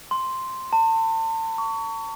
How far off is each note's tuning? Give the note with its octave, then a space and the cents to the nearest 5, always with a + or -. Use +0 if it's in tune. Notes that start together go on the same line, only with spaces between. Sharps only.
C6 +0
A5 +35
C#6 +25